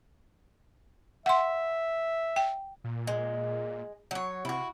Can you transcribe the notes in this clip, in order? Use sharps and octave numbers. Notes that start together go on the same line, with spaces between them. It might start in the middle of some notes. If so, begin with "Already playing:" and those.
E5 F#5 C6
G5
A#2
G#3
F#3 C#5
C3 E4 F#4